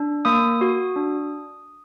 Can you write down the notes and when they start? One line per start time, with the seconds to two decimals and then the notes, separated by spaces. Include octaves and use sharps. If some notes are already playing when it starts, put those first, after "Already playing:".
Already playing: D4
0.25 A#3 D#6
0.61 F#4
0.96 D4